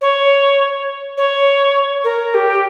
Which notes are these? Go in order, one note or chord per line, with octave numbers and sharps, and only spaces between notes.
C#5
C#5
A#4
G4